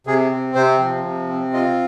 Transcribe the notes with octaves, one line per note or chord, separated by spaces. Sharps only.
C3 G#4
C4
C3 C5
F3
C3
C4
F4 D#5